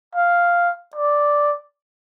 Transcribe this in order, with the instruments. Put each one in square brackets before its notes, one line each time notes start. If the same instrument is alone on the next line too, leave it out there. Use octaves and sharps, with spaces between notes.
[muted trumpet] F5
D5